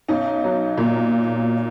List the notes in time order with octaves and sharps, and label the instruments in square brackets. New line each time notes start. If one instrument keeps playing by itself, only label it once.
[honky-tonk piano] B1 C#4 D#4
F#3
A#2